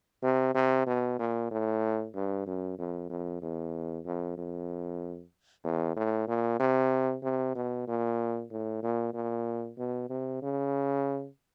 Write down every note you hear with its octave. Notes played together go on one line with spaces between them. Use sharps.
C3
C3
B2
A#2
A2
G2
F#2
F2
F2
E2
F2
F2
E2
A2
A#2
C3
C3
B2
A#2
A2
A#2
A#2
B2
C3
C#3